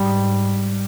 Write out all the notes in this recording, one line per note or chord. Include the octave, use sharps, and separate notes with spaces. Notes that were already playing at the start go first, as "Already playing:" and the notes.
Already playing: G#2 G3